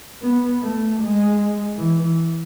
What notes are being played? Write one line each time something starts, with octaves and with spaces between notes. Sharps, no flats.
B3
A3
G#3
E3